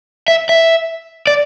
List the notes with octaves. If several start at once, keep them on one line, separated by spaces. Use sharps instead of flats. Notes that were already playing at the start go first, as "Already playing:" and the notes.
E5
E5
D5